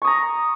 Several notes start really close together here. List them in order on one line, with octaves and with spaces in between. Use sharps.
C#6 D#6 A#5